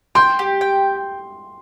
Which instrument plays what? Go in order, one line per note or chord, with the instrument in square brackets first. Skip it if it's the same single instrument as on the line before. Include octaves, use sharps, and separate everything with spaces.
[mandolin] G5 [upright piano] C6
[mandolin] G4
G5